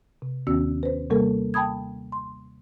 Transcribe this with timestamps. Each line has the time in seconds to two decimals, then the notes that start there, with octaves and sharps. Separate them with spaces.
0.22 C3
0.47 D#2 D#3 B3 C#4 F#4 E6
0.83 B4 C5
1.10 C3 G3 A#3 A4 A#4
1.54 G5 A5 B5 D#6 G#6
2.12 C6